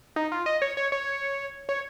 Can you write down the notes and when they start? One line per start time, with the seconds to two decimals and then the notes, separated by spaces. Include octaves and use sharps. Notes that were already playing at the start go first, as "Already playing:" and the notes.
0.16 D#4
0.32 F4
0.46 D#5
0.62 C#5
0.77 C#5
0.92 C#5
1.69 C#5